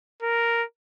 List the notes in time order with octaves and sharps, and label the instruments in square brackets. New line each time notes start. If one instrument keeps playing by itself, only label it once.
[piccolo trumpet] A#4